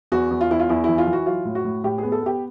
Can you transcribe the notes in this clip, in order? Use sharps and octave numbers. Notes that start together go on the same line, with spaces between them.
E2 F#4
E2
F4
E2 E4
F4
E2 E4
E3 E4
F4
E3
F#4
F#3 F4
A2
F#4
A2
A2 G4
B3 G#4
A4
B3 G4